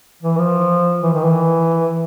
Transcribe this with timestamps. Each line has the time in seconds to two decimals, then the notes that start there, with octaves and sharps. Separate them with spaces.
0.22 E3
0.38 F3
1.03 E3
1.14 D#3
1.24 E3